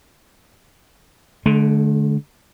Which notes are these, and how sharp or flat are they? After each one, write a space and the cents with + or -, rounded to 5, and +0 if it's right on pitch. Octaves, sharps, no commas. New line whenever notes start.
D3 +0 A3 -45